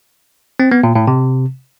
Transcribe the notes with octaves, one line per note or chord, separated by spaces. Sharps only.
C4
B3
A#2
A2
C3